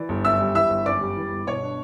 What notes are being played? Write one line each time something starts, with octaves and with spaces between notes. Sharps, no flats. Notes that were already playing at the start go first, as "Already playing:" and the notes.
Already playing: E3 D5
G1
F#2 E5 E6
G3
E3 E5 E6
G1
F#2 D5 D6
G3
E3
G1
B2 C#5 C#6
D4